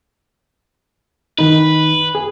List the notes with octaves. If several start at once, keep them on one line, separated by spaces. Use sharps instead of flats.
D#3 D#4 B4
G#4